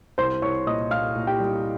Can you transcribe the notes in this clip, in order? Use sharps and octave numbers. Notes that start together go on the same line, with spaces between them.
C2 C5 C6
C2 C#5 C#6
A#2 D#5 D#6
A#2 F5 F6
A#2
G4 G5
G3